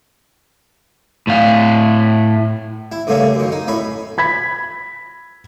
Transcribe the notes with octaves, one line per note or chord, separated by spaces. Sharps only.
A2 F5
E4
G2 C#3 A3 A#3 C#4
F#2 D#3
D#4
A2 C#4 B5
B5 G#6 B6